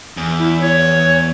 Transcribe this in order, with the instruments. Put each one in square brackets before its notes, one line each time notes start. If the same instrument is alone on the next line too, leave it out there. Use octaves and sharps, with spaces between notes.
[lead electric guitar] E2
[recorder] E4
C#5